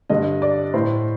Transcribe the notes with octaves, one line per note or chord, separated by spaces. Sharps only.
G2 D3 D#5
D5
A2 C5